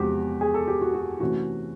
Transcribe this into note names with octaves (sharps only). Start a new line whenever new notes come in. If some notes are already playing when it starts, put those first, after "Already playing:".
Already playing: E2 C3 F3 G#3 F#4 G4
G#4
A4
G4
F#4
F#4
C3 E3 A3 C#4 F#4